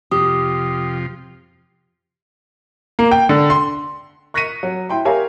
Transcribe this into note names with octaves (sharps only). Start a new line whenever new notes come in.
F2 C3 F3 G4 D#6
A#3
G5
D3
C6
C#6 F#6 A#6 B6 C#7 D#7
F#3
E4 G5 C6
G4 A#4 C#5 E5 F5 G#5